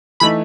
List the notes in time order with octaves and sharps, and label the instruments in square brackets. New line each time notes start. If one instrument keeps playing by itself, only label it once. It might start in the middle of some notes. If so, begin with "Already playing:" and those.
[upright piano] E3 A3 D#4 [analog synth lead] B5